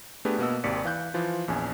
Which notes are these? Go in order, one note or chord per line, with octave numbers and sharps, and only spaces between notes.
A3 B3 D4 G4 G#4 B4
B2 A#3 B3 D#5 E6
G#1 D#2 C3 D5 B6 C#7
E3 F5 F#6 G6
E3 F3 F4
A#1 E2 C#4 G#5